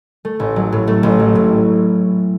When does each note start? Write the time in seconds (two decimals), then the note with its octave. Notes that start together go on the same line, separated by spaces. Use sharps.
0.25 A3
0.40 A1
0.56 F#3
0.72 A2
0.87 A3
1.03 A1
1.19 F#3
1.35 A2